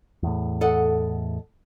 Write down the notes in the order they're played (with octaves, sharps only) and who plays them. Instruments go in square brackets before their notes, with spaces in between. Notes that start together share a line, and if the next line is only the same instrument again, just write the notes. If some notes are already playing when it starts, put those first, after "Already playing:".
[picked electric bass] E2 A2
[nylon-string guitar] A4 D#5 F#5